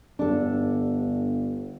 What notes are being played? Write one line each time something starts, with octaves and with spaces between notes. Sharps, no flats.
G1 D4 A4